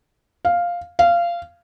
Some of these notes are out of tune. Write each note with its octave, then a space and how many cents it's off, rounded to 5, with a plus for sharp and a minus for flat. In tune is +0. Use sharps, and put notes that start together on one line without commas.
F5 +0
F5 -20